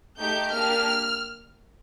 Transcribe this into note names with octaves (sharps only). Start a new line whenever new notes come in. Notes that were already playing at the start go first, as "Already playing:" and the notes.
A3 D#4 G4 G6
A#3 D4 G4 F6